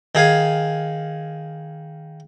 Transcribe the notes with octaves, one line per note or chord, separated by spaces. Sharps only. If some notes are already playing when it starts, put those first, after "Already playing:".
D#3 G#4 F5 G#5